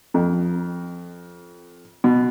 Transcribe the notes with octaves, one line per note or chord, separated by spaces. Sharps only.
F2
B2